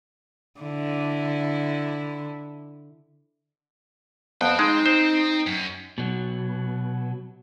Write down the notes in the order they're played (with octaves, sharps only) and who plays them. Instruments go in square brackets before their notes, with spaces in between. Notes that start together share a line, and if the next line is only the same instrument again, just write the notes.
[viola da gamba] D3 E4
[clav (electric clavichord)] F2 [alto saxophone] B3 [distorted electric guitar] C4 G5
[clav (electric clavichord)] G#3 [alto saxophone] D#4
[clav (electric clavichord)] C5
[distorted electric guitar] F#2
[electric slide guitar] B2 F#3